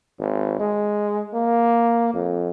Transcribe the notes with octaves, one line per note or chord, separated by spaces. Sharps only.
G#1
G#3
A#3
F2